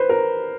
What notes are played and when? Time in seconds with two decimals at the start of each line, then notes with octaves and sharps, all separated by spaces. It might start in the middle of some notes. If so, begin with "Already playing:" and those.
Already playing: B4 C5
0.09 A#4